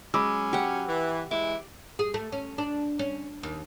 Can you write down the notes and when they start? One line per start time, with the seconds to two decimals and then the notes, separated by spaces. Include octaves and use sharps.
0.14 F#3 G#3 C#4 B5 D6 E6
0.53 G4 F#5
0.88 E3
1.31 E3 G#3 E4 D6
1.99 G#4
2.14 A3
2.32 C#4
2.58 D4
2.99 C#4
3.43 D#2